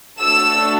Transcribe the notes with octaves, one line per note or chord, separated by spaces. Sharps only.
A3 D4 F#4 A4 E6